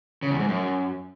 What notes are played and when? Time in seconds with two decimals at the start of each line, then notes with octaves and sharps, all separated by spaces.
0.22 C#3
0.31 E2
0.40 G#2
0.48 F#2